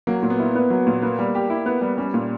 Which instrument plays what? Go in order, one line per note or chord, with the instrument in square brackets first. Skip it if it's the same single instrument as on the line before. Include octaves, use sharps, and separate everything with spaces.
[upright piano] F#3 [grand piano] A#3
[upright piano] A#2
[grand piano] B3
[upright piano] E4
B3
F#3
A#2
[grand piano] A#3 [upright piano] B3
[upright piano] G3
G4
E4
B3
G3
[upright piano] G3 [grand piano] C#4
[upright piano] A#2